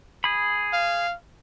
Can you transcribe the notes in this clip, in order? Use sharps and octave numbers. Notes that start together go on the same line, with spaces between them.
G#4 B5
F5